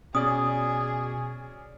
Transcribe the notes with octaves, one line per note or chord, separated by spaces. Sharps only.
B2 C#4 G#4 D5 D#6